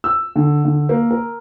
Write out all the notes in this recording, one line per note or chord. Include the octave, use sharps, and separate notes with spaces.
E6
D3
D3
A#3
A#4